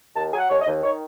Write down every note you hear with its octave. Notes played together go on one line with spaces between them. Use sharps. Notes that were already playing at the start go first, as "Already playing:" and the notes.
D#2 A5
F#3 G#5
F#5
D#2 C#5
D#5
D#2
D#3 C#5